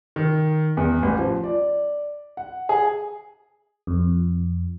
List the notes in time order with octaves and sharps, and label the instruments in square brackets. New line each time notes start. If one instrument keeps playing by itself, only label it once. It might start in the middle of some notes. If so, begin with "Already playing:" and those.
[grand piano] D#3
E2
A1
F3
D5
F#5
G#4
[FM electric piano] F2